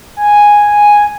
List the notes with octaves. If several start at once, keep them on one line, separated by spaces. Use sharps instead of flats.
G#5